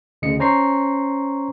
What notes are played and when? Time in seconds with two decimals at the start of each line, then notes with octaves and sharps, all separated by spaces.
0.22 D2 C#3 D#5 C#7
0.40 C#4 C5 A#5 C#6 C7